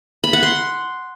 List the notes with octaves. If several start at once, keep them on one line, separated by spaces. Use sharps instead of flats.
B5
F#5
C6